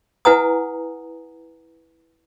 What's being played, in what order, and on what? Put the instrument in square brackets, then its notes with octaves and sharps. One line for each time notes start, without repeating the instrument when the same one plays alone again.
[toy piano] E4 B4 F#5 G#5 A#5 D#6